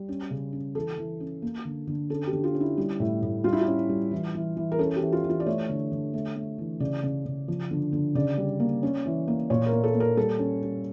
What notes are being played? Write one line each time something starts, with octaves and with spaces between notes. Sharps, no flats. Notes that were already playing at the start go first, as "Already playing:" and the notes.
Already playing: G3
C#4
C#3
C#4
E3 A4
E3
C#4
A#3
D3
D3
C#4 A4
G4
D3
F4
C#4
E4
G3
A2
A2
G3 F4
E4
F4
C#4
G3
E3
E3
E3
A#4
C#4 A4
G4
E3
F4
E3
F4
D5
A3 C#5
D3
D3
A3
A3
E3
C#3 D5
C#3
C#3
F3
D3
D3
C#3 D5
G3
A#3
C#4
E3
A#3
A#2 C#5
A#4
A#3
A4
A#3
A#4
G3 A4
C#4
G3